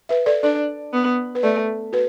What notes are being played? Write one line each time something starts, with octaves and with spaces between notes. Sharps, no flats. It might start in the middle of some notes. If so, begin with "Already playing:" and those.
B4 E5
A4 D5
D4 A4 D5
B3
B4
A3 A4 D5
F#4 B4